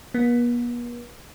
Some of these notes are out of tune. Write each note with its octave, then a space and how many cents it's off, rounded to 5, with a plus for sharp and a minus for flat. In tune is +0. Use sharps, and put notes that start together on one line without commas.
B3 -45